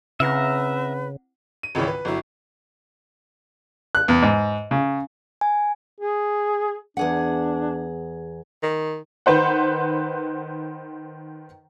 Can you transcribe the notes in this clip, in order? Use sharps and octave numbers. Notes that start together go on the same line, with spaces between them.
C#3 C4 E4 B4 E5 F#5 A#5
D#7
G#1 C#2 C#3 E3 C#5
B4
G1 F#3 E4
F#6
E2
G#2
C#3
G#5
G#4
E2 D4 G#4 F#5
D#3
D#3 B4 C5 F#5